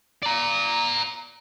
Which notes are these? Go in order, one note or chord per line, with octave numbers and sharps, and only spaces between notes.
D5 A#5